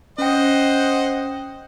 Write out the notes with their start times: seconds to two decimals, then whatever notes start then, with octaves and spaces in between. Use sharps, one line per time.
0.18 C#4 C5 D#5 F#5 G5